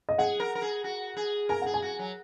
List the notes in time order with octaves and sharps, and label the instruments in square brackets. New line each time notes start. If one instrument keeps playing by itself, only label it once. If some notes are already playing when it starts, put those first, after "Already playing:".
[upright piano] D#5
[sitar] G#4 [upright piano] F#5
[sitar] A#4
A#4
G#4
F#4
G#4
[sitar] A#4 [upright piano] G#5
[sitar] G#4 [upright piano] F#5
[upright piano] G#5
[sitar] F#4
F#3